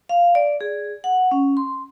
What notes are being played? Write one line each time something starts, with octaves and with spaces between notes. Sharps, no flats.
F5
D5
G#4
F#5
C#4
C6